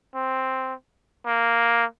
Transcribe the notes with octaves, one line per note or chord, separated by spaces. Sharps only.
C4
A#3